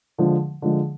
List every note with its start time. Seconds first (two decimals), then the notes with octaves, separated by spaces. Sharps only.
0.18 D3 F3 G#3
0.62 D3 F3 G#3